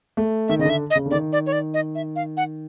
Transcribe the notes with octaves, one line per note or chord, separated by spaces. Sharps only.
A3
D#3 E5
C#3 D#5
D3 E5
D#5
C#3
D3
D#3 D5
D5
C#5
D5
D#5
E5
F5
F#5